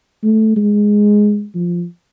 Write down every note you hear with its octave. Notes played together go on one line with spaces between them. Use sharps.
A3
G#3
F3